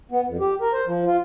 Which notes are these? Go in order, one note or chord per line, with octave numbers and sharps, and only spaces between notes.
B3
F2
G4
A#4
C5
F3
F4